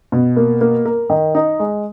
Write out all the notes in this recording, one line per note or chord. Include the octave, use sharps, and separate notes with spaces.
B2
A#3
A#3
A#4
D#3
D#4
G#3